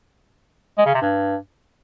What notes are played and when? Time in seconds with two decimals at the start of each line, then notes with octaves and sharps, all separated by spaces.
0.78 G#3
0.86 C#3
0.94 C3
1.02 G2